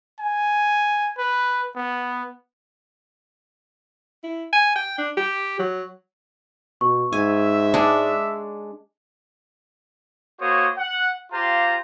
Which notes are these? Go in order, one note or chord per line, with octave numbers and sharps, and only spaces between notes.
G#5
B4
B3
E4
G#5
G5
D4
G4
F#3
B2 C#6
G#2 E5 G#5
G#3 D4
A#3 F#4 C5 C#5 D#6
F#5
F4 G4 C5 F5 A#5